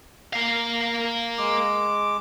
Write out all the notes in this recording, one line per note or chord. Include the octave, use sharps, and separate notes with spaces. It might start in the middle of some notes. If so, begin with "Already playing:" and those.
A#3 F5
G#3 D6